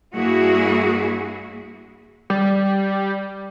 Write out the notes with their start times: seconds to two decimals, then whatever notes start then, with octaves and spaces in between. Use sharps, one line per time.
0.15 G2 A#3 E4 F#4 G#4
2.30 G3